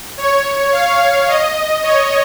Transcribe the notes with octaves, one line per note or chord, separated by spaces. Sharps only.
C#5
F5
D#5
C#5